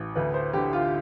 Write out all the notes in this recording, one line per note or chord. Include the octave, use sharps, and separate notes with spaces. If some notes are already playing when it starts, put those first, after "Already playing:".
Already playing: A1
D2 B4
C5
D3 G4
F4